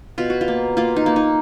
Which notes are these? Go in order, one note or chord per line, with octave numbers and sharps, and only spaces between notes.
B2 F4
F#4
F4
A#3
A#3 F4
D#4
A#3
D#4